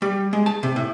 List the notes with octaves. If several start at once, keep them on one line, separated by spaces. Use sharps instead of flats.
G3
G#3
A5
C3
A2